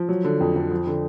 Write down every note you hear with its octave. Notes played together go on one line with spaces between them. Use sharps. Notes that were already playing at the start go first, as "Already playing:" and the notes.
Already playing: F3
F#3
D3
F2
F2
F3
D3